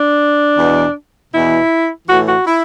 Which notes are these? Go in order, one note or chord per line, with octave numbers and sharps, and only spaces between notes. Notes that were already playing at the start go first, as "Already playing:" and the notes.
Already playing: D4
E2 B2
E2 B2 E4
A2 E3 F#4
F#4
E4